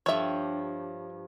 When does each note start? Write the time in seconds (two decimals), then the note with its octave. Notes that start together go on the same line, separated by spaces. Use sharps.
0.06 G2 F3 C#5 E5